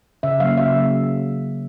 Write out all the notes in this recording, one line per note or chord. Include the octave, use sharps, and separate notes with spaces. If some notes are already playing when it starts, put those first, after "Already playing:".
C#3 E5
F#3 A#3 F5
C#3 E5
F#3 A#3